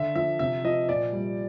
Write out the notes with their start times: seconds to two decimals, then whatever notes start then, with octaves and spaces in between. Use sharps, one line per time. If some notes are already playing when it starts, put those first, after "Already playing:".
Already playing: D3 E5
0.15 F3 E5
0.39 C3 E5
0.64 F3 D#5
0.89 A#2 D5
1.13 G3